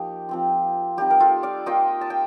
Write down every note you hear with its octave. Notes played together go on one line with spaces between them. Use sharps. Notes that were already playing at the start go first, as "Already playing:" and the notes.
Already playing: F3 A#3 D#4 G4
F3 C4 F4
G3 C4 D#4 G4
A#4
F4 A4
D5 F5
A#3 F4 D#5 G5
A5
G5